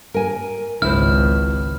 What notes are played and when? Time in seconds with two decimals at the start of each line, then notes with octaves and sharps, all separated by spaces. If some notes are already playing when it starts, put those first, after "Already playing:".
0.14 A#4 G#5
0.82 G#1 C#2 E4 C5 F6